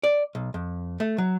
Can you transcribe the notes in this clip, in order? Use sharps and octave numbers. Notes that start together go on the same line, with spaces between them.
D5
B1
F2
A3
F#3